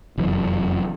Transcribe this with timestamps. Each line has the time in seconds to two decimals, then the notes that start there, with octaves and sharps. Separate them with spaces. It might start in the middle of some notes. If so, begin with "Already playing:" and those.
0.18 F1 F#2 E3